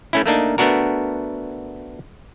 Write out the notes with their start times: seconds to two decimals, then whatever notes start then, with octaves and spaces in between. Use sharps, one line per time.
0.13 A3 C#4 E4
0.26 A3 A#3 D4 D#4
0.58 A3 B3 D4 F#4 A#4